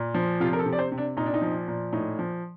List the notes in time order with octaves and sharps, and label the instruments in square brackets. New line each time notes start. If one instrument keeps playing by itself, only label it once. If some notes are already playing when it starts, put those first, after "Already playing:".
Already playing: [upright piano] A#2
F3
C3 F4
A#4
A4
C3
D5
C5
C3
D4
A#2 D#4
D4
D#4
F3
A#2
A2 D#4
F3